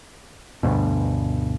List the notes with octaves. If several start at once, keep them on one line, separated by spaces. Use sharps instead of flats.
D2 G2 B2